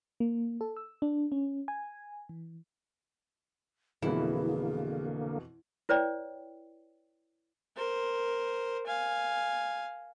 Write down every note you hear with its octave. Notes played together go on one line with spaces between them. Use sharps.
A#3
A4
E6
D4
C#4
G#5
E3
F2 B2 D3 E3 A#3 E4 G#4
E4 B4 C#5 D5 G5
A#4 C5
F5 G#5